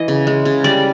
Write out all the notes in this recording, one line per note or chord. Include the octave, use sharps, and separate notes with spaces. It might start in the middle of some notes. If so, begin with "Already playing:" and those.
Already playing: E3 D#5
C#3
G#3
C#3
G3 D5